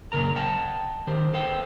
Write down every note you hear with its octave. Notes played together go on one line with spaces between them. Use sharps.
F#2 A#2 C#3 A#4 A#5
D#5 F#5 G5 A5
D#3 G4 C5
A4 B4 C5 F5 G5